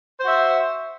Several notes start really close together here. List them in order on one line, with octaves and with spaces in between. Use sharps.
C5 F#4 E5